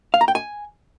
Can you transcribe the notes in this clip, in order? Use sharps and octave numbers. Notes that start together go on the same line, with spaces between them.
F5
A#5
G5
G#5